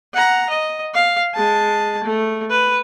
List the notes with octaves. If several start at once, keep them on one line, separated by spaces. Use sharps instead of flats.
F#5 A#5
D#5
F5
G#3 A5
A3
B4